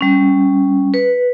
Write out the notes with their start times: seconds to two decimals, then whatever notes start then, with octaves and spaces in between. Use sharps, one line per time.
0.01 G3 C#4
0.94 B4